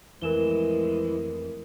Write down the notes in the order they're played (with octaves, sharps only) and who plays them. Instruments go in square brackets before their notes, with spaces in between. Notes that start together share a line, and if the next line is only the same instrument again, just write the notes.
[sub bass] F2 [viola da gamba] A2 F3 G#3 [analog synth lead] E3 [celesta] A#4 E7 G7